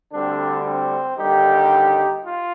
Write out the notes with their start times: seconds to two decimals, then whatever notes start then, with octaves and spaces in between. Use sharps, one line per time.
0.13 D2 D3 G3 C4 D4
0.65 C4
1.18 D#2 D3 G3 D#4 G4
2.24 F4